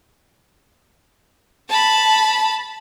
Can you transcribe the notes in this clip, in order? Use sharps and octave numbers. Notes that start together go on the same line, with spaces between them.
A5 B5